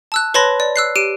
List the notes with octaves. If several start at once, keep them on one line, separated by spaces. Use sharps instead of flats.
A5 E6 F#6
B4 C#5 A5 B5 C6 A#6
D5
E6 F#6 C7
G4 D7 D#7